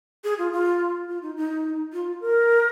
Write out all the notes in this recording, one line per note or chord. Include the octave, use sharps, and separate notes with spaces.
G#4
F4
F4
F4
D#4
D#4
F4
A#4